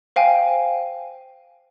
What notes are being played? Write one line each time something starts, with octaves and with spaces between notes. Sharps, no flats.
C5 F5 G5 G#5